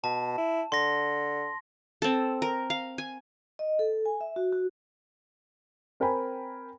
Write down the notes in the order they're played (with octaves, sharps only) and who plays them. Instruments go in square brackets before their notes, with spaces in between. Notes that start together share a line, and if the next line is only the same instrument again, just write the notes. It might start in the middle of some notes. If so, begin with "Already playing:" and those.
[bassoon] B2 [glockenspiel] A5
[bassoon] E4
[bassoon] D3 [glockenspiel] C6 A#6
[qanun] C4 A4
A#4
F5
G#5
[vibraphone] D#5
A4
G#5
E5
F#4
F#4
[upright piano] C4 A#4 G5 G#5 B5